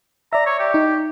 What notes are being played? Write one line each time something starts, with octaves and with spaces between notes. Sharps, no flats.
D5 E5 A#5
C#5
G4
D#4